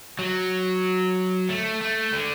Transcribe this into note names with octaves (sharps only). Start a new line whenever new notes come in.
F#3
A3
A3
D3